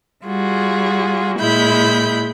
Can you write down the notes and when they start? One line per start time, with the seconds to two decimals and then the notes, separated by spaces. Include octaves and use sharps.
0.25 G3 F4 F#4 G#4
1.39 A#2 G#3 E4 B5 G6